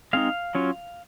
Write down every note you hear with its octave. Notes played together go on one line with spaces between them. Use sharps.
G#3 C4 D#4 F5
F#3 C#4 F4